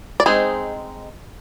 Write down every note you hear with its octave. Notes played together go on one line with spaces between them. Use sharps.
D5
G#3 C4 D#4 G#4 C5